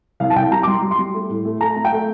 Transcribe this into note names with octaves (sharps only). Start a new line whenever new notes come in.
C2 F5
A5
C2 G5
G3 A#5
D6
G3 C6
G3
C6
G3
A3
A2
A3
A3 A#5
A3
G5
A3